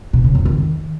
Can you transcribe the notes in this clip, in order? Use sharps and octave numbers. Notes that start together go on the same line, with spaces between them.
B2
C#3
F2
D#3